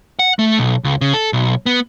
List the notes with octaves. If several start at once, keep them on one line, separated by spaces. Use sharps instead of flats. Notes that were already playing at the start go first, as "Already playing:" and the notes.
F#5
A3
B1
C#2
C#3
A4
B1
B3